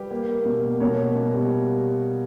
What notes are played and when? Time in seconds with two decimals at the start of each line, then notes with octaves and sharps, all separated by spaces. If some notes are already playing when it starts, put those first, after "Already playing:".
Already playing: G3 G4 B4
0.11 A#3
0.29 A#3
0.45 B2
0.64 A#3
0.80 B2 A#4 C#5
0.97 A#3
1.15 B2
1.32 G3